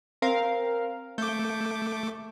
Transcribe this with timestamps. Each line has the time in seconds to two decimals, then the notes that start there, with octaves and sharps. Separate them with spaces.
0.22 C4 A#4 F5
1.18 A3 D6 G6